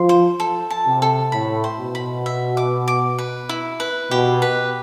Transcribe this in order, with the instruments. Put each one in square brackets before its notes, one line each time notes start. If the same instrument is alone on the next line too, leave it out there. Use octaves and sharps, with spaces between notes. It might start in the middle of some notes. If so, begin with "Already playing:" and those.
Already playing: [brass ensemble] F3 [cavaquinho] C6
[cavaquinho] C5
A4
A5
[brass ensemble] C3
[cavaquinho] A4
[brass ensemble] A2 [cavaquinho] B5
[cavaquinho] C5
[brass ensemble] B2
[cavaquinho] B5
E5
D6
D6
B4
E4
B4
[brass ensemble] B2 [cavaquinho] G4
[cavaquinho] B4